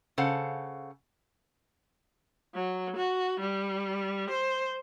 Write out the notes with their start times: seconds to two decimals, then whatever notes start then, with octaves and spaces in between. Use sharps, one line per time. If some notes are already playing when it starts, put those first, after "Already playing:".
0.18 C#3 A4 C5 F5 F#5
2.54 F#3
2.97 F#4
3.40 G3
4.30 C5